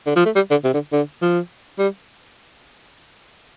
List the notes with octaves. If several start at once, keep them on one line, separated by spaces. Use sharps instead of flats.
D3
F3
A3
G3
D3
C3
D3
D3
F3
G3